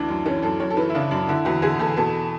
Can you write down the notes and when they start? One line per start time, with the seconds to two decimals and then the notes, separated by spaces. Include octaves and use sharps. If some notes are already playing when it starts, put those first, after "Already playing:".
Already playing: D2 E3 D4
0.09 F#2
0.26 E3 C#4
0.43 F#2 A4
0.60 F#2 C#5
0.70 A4
0.77 E3 B4
0.90 E4
0.95 C#3 D4
1.11 F#2 D4
1.29 D3 E4
1.45 E2 F#4
1.62 D3 G#4
1.79 E2 A4
1.97 B2 A4